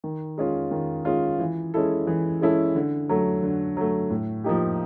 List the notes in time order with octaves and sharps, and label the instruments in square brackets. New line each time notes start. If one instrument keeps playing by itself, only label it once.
[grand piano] D#3
G#3 C#4 F4
D#3
G#3 C#4 F4
E3
G#3 C#4 E4 A4
E3
G#3 C#4 E4 A4
D3
F#3 A3
D3
F#3 A3
A2
F3 A#3 D#4 G4